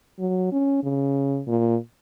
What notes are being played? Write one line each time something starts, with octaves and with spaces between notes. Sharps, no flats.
F#3
C#4
C#3
A#2